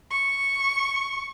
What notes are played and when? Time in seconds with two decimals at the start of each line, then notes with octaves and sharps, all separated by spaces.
0.11 C#6